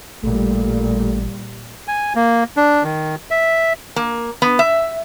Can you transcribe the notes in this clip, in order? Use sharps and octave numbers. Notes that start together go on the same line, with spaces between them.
A1 A#2 G3 A3
G#5
A#3
D4
D#3
E5
A#3
B3
E5